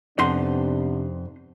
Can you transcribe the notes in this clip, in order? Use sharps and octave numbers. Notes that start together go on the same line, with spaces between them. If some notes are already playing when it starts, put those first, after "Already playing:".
F2 C3 B3 D4 D#4 F#5 C6